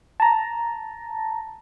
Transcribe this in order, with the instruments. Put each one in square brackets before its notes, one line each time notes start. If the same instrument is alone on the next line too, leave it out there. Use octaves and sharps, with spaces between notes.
[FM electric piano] A5 A#5